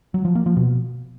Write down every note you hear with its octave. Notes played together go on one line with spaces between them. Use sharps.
F#3
F3
A#3
F3
B2